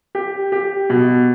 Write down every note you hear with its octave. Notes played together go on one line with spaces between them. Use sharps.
G4
G4
B2